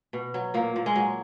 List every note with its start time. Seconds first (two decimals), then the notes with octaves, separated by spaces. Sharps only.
0.13 B2
0.34 F#3
0.54 A#2 A#3
0.76 A#2
0.86 G#3
0.95 F#3